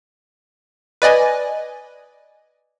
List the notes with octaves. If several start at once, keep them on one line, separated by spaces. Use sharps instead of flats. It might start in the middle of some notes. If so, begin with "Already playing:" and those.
B4 D5 D#5 G#5